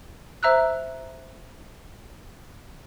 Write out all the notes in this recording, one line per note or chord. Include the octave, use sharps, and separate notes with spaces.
C5 E5 A#5 E6 F#6